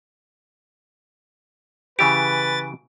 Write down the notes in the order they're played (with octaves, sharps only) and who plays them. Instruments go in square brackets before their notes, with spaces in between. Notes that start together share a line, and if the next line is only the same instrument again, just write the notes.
[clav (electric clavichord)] C#3 E3 G4 [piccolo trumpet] B4 [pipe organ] A6 [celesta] D7